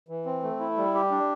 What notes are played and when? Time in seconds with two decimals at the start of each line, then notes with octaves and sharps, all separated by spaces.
0.09 E3
0.26 C4
0.43 A3
0.60 E4
0.77 G3
0.94 G4
1.11 D4